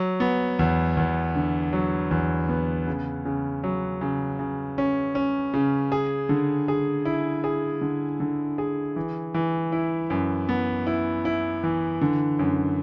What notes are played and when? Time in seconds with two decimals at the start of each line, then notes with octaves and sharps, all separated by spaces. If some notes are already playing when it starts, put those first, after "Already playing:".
Already playing: F#3
0.20 B3
0.59 E2
0.97 E2
1.35 D3
1.73 F#3
2.11 E2
2.49 B3
2.87 C#3
3.25 C#3
3.64 F#3
4.01 C#3
4.39 C#3
4.78 C#4
5.15 C#4
5.54 C#3
5.92 G#4
6.29 D3
6.68 G#4
7.05 E4
7.44 G#4
7.81 D3
8.20 D3
8.58 G#4
8.96 E3
9.34 E3
9.72 E4
10.10 F#2
10.49 B3
10.87 E4
11.25 E4
11.63 E3
12.01 D3
12.39 F#2